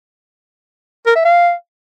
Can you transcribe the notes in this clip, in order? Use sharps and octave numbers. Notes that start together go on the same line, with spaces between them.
A#4
E5
F5